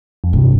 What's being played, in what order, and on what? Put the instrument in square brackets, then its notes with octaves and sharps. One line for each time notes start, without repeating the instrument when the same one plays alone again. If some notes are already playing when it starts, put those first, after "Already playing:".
[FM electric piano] F2
[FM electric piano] G2 [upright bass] C3